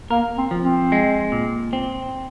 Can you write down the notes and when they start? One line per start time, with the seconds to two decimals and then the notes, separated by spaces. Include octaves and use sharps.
0.11 A#3 A#4
0.38 C4
0.51 F3
0.64 C4
0.92 G#3
1.32 A#2
1.73 C4